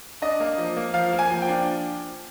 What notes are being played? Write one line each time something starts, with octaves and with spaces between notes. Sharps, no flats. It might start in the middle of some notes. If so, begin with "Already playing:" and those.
D4 D#5
A#3
F3
A#3
F3 F5
A#3
G#5
F3
G5
D4